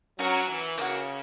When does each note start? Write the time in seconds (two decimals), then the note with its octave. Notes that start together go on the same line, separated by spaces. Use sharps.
0.19 F#3 C#4 F#4 A#4
0.48 E3
0.77 C#3 A#3 D#4
0.81 F#4